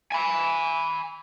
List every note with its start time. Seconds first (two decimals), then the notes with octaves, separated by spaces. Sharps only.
0.12 G#5 B5